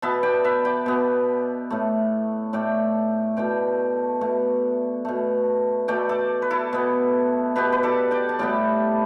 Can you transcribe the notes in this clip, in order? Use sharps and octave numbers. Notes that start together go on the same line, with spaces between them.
B2 B3 E5 A5
D5 G5
B4 E5
D5 G5
B2 B3
A2 A3
A2 A3 D5 G5
B2 A3 D5 G5
B2 A3
B2 A3
B2 A3 D5 G5
A4 D5
B4
E4 A4
B2 B3
B2 B3 G4 B4
B4
A4 D5
D5 G5
A5
A2 G3 B3 D5 G5